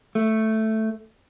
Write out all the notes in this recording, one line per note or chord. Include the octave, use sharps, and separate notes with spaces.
A3